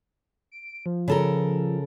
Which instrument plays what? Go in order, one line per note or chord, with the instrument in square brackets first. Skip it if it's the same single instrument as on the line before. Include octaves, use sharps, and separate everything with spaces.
[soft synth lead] D7
F3
[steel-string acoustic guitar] C#3 A4 A#4